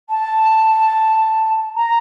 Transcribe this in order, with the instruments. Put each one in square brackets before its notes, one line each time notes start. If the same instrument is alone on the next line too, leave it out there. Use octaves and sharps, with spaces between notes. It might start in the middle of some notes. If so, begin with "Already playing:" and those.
[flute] A5
A#5